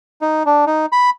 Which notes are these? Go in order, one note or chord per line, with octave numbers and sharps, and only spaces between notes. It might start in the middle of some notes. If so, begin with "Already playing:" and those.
D#4
D4
D#4
B5